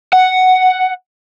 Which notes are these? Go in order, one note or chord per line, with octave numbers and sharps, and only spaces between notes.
F#5